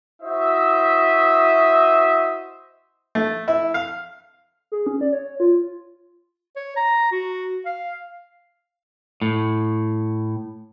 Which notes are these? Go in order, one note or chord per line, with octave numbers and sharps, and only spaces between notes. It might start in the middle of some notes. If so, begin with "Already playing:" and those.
E4 F#4 C5 D#5 E5
A3
E4
F5
G#4
C#4
D5
C#5
F4
C#5
A#5
F#4
F5
A2